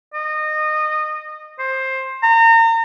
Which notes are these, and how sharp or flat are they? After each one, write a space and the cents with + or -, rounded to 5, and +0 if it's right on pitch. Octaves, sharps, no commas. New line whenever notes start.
D#5 -25
C5 +15
A#5 -35